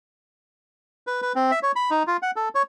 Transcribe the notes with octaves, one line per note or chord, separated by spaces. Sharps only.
B4
B4
C4
E5
C#5
B5
D#4
F4
F#5
A4
C#5